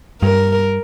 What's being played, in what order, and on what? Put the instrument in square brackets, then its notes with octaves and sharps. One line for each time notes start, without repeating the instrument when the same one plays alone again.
[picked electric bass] G2 [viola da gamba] A#4